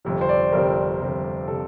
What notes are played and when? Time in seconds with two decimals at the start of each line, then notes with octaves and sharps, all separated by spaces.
0.05 G1 F2 C3
0.21 C5
0.29 D5
0.52 G1 F2 C3 A#4
1.00 G1 F2 C3
1.48 C3 A4